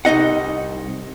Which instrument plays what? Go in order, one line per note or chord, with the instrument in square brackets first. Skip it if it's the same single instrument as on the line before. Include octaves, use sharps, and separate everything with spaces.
[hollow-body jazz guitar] C2 D#4 D#5 F#5